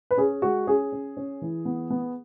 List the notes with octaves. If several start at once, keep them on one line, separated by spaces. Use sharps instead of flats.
B4
C#4 G#4
G#3 F#4
C#4 G#4
C#4
C#4
E3
B3
B3